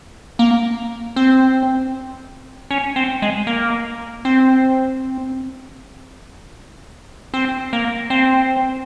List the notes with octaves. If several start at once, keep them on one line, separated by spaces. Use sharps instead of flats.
A#3
C4
C#4
C4
G#3
A#3
C4
C4
A#3
C4